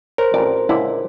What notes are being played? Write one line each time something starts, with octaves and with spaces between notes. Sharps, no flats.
A#4 C5 C#5
A1 F2 D5
C#2 A#2 D3 E4